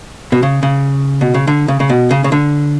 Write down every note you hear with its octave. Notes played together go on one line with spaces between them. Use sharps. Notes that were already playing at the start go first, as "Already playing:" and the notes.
B2
C#3
C#3
B2
C#3
D3
C#3
C#3
B2
C#3
C#3
D3